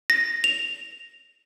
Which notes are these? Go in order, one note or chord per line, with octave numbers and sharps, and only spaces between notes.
A#6
F7